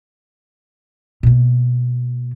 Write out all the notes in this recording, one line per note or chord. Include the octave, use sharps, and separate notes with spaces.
B2 A#3